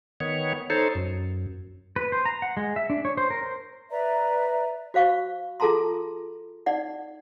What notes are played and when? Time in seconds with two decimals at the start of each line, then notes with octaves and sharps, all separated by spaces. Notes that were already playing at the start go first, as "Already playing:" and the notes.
0.20 D#3 B3 C#5
0.70 D#4 A4 C5 C#5
0.95 F#2
1.96 B4
2.12 C5
2.26 A#5
2.42 F#5
2.57 G#3
2.76 E5
2.90 D4
3.05 C#5
3.17 C5
3.30 A#4
3.43 C5
3.91 B4 D5 E5 A#5
4.94 F#4 C5 F5 C#6
5.60 F4 G#4 A4 A5 A#5 C6
6.66 D#4 D5 F#5